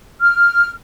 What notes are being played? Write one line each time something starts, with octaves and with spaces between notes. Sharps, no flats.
F6